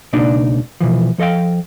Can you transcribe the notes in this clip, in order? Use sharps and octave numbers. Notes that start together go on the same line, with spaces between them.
C#2 B2 A#3 D4 D#4 D5
B2 E3 F3
F3 A4 D#5 F5 G5